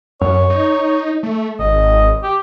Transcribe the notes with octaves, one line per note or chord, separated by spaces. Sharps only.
F#2 C#5
D#4
A3
G#1 D#5
G4